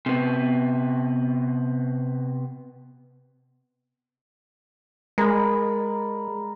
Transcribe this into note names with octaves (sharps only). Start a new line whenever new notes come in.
C3 B3
G#3 A#4 D5 B5